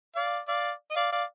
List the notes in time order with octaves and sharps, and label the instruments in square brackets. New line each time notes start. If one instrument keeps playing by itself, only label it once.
[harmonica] D5 F5
D5 F5
D#5
D5 F5
D5 F5